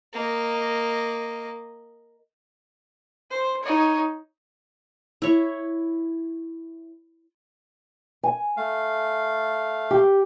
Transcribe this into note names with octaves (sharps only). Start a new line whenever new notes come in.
A#3 D#5
C5
D#4 C#5
E4 C#5
G#5
A3 F5
G4